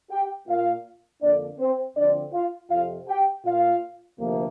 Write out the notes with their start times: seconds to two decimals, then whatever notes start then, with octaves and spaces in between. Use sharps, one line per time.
0.11 G4 G5
0.48 A#2 A#3 F4 F5
1.22 F2 D3 A#3 D4 D5
1.59 C4 C5
1.97 D2 D3 F3 C4 D4 D5
2.33 F4 F5
2.70 F2 C3 F3 C4 F4 F5
3.08 G4 G5
3.45 A#2 A#3 F4 F5
4.19 D2 C3 F3 A#3